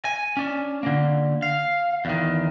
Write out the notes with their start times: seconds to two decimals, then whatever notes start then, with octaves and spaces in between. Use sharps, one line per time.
0.05 G#5
0.37 C#4 D4
0.83 D3 A#3
1.42 F5
2.05 E2 D#3